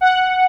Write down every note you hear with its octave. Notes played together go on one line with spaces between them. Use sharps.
F#5